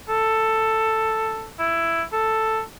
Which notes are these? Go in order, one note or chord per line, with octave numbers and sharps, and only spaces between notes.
A4
E4
A4